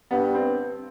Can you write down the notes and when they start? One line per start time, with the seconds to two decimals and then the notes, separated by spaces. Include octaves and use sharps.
0.11 G2 B3
0.35 C4